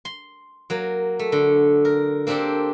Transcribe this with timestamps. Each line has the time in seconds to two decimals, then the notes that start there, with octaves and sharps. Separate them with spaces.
0.05 C6
0.70 F#3 A#3
1.19 A3
1.32 D3
1.85 A#4
2.27 A#3 C4 D4 G4 A4 C5